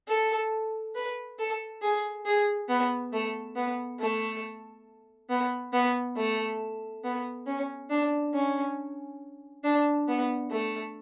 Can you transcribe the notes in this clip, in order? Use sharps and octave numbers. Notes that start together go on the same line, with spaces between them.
A4
B4
A4
G#4
G#4
B3
A3
B3
A3
B3
B3
A3
B3
C#4
D4
C#4
D4
B3
A3